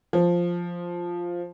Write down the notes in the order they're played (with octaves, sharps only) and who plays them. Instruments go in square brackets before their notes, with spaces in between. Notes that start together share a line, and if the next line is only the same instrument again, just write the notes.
[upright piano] F3